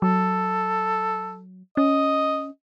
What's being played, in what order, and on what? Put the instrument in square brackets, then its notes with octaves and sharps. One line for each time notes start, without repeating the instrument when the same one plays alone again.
[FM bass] F#3 [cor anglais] A4
[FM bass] C#4 [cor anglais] D#5